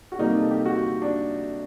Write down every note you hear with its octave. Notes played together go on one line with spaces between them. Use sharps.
F#4
C3 G3 A#3 D#4
A4
G4
F#4
D4